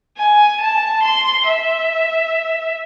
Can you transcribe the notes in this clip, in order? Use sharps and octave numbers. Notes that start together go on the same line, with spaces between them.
G#5
A5
C6
E5